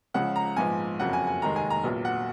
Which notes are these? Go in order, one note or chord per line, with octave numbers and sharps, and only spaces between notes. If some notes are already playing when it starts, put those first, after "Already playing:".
C#2 C#3 F3 F#5
A#5
A#1 G#2 F3 B3 G#5
F#1 F2 C#3 F#3 F#5
G#5
G#5
F1 D#2 D#3 G#3 A#5
G#5
A#5
A#1 A#2 F#3 B3
F#5